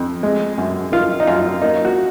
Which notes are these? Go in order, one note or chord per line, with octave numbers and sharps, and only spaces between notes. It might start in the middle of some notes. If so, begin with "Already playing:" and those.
Already playing: F2
G#3
F#2
D#3 F4
D#4
F#2 F4
A#3 D#4
F#4